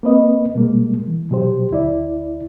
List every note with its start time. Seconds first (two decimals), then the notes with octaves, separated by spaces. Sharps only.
0.03 A#3 C4 B4 D#5
0.55 B2 G3 G#3 A#3
1.07 E3
1.31 B2 F#3 G4 C5
1.71 D2 E4 D5